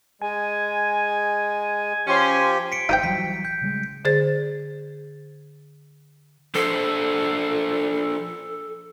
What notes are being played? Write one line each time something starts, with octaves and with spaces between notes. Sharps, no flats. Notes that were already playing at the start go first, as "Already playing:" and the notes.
G#3 G#5
F3 C#4 G4 C6
B6 C#7 D7
G#1 D#4 C5 G5
E3 F#3 G3 B6
G6
C#3 G3 G#3
D3 G#4 C5 A6
F3 D4 A4 C5